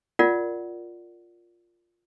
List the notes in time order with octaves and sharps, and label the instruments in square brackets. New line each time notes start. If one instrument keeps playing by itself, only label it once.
[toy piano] F4 A#4 D5 F#5